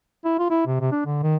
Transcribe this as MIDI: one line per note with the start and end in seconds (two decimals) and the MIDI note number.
0.25 0.38 64
0.39 0.46 65
0.50 0.64 64
0.67 0.80 48
0.80 0.89 48
0.92 1.03 62
1.06 1.22 50
1.23 1.36 51